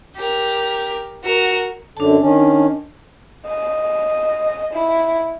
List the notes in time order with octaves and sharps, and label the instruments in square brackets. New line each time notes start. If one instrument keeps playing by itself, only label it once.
[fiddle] G4 A#4
F#4 A#4
[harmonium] F#2 D3 [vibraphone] D4 A5
[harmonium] D#3 C#4
[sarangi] D#5
E4